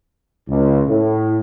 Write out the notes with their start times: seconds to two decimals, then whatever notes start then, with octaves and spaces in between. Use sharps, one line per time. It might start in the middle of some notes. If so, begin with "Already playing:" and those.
0.48 C#2
0.86 A2